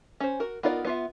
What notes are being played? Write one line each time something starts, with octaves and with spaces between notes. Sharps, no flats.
C#4 C5
F#4 A#4
B3 D#4 F4 A#4 D5
B3 F4 E5